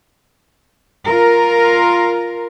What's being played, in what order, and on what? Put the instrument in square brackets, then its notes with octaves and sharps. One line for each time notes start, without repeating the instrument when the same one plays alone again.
[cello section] F4 A#4